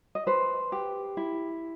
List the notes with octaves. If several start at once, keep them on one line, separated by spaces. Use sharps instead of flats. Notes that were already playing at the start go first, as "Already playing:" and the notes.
D#5
B4 C5
G4
E4